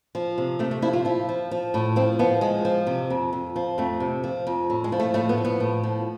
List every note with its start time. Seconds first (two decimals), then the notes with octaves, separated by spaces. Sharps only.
0.15 F3
0.38 C3
0.59 C3 A3
0.71 A3
0.82 F3 E4
0.93 F4
1.05 F3 E4
1.29 F3
1.51 F3
1.74 A2
1.96 F3 C4
2.19 F3 B3
2.41 F3 G#3
2.65 F3
2.87 C3
3.10 F2
3.33 F2
3.56 F3
3.78 F2 A3
4.00 C3
4.24 F3
4.47 F2
4.70 A2
4.84 G#3
4.92 F3
5.00 A3
5.14 A2 A3
5.29 B3
5.38 F3
5.45 B3
5.60 A2
5.83 F3